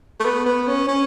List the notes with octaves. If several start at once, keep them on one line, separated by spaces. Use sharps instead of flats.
A3
B3
B3
C#4
C#4